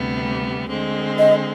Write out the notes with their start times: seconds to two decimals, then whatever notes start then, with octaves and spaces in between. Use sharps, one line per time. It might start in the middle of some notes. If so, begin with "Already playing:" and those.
Already playing: D2 C3 G3 B3
0.69 D3 G#3 C4
1.18 D#5